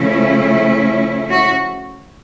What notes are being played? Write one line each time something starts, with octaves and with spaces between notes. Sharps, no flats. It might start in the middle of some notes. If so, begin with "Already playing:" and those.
Already playing: C#3 F3 A3 C#4 E4
F#4